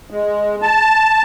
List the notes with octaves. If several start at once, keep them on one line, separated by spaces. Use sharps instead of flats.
G#3
A5